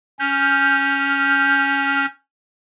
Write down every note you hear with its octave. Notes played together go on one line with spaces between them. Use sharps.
C#4 F6 G6